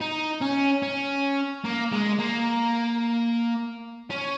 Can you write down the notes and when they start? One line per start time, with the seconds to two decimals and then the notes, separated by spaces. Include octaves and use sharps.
0.01 D#4
0.42 C#4
0.83 C#4
1.65 A#3
1.92 G#3
2.19 A#3
4.10 C#4